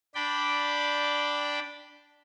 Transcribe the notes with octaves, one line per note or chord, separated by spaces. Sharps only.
D4 D5 G5 B5